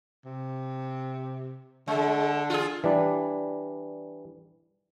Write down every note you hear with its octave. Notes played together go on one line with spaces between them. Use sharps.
C3
D3 G#3
F4 G#4
E3 G3 D4